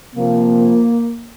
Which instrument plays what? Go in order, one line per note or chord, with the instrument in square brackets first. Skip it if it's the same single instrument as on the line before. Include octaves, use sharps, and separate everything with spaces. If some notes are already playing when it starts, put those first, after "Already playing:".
[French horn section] C3 F3 A#3